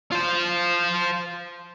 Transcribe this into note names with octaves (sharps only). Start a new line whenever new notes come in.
F4 C5